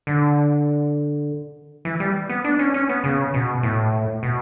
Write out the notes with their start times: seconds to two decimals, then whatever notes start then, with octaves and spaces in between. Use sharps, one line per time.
0.07 D3
1.85 E3
2.00 G3
2.29 B3
2.45 D4
2.59 C#4
2.74 C#4
2.89 B3
3.04 C#3
3.34 B2
3.63 A2
4.23 B2